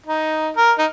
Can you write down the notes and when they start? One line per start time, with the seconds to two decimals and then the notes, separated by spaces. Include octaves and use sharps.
0.06 D#4
0.57 A#4
0.78 D#4